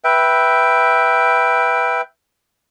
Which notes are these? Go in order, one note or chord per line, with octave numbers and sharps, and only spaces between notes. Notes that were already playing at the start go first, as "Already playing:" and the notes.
B4 E5 G5